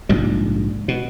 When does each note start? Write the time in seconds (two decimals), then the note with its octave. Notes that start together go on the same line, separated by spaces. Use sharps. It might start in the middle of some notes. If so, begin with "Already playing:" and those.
0.09 A#1 G#2 C3 G3
0.88 B2